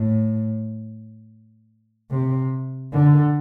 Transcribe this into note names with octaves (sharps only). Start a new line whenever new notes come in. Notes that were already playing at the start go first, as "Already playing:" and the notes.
Already playing: A2
C3
D3